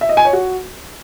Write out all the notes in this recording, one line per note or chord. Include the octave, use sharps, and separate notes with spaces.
E5
D#5
G#5
C#5
F#4